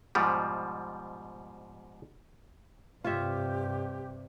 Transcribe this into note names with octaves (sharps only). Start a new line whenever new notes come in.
G#2 B2 F3 G3
G2 C3 F4 G4 C#5 E5